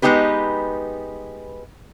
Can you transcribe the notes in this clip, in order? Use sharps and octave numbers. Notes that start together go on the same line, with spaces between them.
G#3 B3 D#4 G4 B4